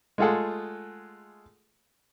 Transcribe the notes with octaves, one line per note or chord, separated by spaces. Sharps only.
G#3 A3 F4 G#4 A4 F#5